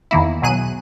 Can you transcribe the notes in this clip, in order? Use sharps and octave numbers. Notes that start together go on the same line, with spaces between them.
E2 D#3 A#3 E4
B1 B2 F#3 G#4 F#6 D#7